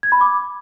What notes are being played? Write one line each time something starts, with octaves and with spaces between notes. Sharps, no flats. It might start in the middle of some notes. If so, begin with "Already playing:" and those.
G#6
B5
D6